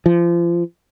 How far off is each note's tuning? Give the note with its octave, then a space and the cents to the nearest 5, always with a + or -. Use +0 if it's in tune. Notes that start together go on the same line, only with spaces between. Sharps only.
F3 -30